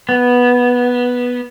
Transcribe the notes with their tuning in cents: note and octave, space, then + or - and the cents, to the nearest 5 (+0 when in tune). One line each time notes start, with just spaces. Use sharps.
B3 -10